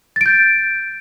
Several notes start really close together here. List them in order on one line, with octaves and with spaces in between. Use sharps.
A6 D7 G6